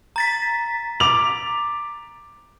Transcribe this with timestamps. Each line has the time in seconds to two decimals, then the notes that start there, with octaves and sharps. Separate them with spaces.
0.16 A#5 A6 B6
1.00 D6 F7